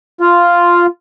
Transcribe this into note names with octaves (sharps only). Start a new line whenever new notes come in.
F4